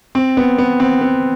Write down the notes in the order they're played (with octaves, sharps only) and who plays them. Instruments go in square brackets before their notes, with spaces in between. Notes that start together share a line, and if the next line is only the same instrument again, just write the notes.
[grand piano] C4
B3
B3
C4
B3